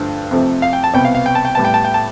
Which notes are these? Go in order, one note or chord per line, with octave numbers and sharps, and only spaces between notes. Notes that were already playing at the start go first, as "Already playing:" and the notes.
Already playing: G2 D3 F3 A3
F2 C3 F3 A3
F5
G5
A5
C2 B2 B3 G5
F5
F5
G5
A5
G5
A2 G3 B3 A5
G5
A5
G5
A5